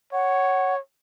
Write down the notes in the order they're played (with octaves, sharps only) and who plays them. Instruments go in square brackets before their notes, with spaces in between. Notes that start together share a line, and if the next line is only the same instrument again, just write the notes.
[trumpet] C#5 [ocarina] F#5